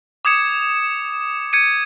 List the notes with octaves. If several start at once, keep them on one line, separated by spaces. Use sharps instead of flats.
D6 D#6 G#6 C#7 E7
G#6 C#7 D#7